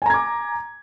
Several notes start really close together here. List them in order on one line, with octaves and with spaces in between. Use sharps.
G#5 A#5 G#6 D6